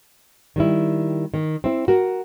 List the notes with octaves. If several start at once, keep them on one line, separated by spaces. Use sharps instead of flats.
D#3 G3 E4
D#3
C4 E4
F#4 A#4